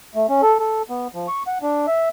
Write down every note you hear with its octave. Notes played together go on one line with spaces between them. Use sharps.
A3
C#4
A4
A4
B3
F3
C#6
F#5
D4
E5